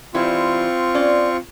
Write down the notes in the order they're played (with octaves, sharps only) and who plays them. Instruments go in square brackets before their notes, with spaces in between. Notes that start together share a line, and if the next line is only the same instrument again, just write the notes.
[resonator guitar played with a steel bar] E3 G3 E4 [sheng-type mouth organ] C4 F4 C#6
[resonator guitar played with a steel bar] C#4 D5